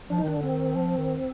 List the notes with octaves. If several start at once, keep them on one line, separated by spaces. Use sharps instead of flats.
F3 D4
D#4
D#3 D4
D3
C4
D#3
F3
D#3